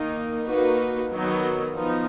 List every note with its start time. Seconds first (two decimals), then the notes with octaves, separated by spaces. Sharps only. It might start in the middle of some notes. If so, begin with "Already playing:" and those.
Already playing: D#3 A#3 D#4
0.47 A#3 D#4 F#4 B4
1.11 D#3 F#3 B3 D#4
1.75 F3 B3 D#4